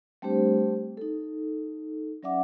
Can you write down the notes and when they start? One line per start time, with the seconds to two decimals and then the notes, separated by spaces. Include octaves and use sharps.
0.22 G3 A3 C4 D4 G4 C5
0.97 D#4 A4
2.23 F#3 C#4 D5 E5 F#5 D6